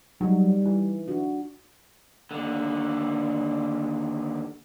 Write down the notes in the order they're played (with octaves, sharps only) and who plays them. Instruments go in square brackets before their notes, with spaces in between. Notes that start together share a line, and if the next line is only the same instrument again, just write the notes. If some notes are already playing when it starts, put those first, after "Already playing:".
[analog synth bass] F#3 [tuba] G3 [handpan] D#4
[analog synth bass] E3
[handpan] D4 F#4
[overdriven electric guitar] D#2 D3